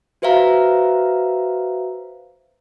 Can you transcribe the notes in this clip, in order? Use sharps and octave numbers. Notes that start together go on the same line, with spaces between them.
F#4 B4 C5 E5 F5 A#5